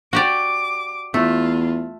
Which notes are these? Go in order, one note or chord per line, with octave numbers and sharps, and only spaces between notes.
F#4 G4 D5 D6
E2 A3 F4